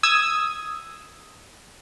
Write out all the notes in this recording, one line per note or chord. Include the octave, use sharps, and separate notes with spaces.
D#6 E6 G#6